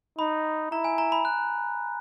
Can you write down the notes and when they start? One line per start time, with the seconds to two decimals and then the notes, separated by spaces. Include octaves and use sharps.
0.18 D#4 B5
0.71 E4 A#5
0.84 G#5
0.98 A#5
1.12 B5
1.25 F#6